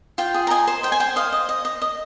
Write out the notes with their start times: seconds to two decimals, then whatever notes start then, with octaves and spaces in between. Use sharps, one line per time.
0.18 F4 G5
0.34 G#4
0.47 A#5
0.50 D#5 G#5
0.67 C5
0.83 C5 G5
0.92 G#5
1.00 C5 G5
1.16 D#5 F5
1.32 D#5
1.49 D#5
1.65 D#5
1.82 D#5